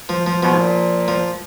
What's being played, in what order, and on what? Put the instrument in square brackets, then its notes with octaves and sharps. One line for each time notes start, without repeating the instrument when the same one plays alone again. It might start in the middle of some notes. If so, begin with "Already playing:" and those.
[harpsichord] F3
F3
[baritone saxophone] B2 [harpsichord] F3
[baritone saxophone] G#2
A#2
[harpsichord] F3